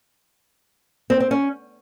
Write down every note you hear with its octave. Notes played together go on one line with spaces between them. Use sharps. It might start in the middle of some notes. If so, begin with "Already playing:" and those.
C4
C4
C#4